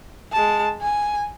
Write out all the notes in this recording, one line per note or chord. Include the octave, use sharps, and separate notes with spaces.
G#3 A5
G#5